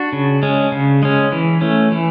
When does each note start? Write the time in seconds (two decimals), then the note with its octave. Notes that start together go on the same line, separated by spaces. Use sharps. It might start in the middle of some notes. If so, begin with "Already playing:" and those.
Already playing: D4 F#4
0.13 C#3
0.43 G#3 C#4
0.72 C#3
1.03 G#3 C#4
1.32 E3
1.61 A3 C#4
1.92 E3